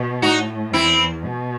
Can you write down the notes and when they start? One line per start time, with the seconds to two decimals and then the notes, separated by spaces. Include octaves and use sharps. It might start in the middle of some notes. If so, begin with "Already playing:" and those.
Already playing: B2
0.22 A2 D#4 F#4
0.73 E2 C4 E4
1.25 B2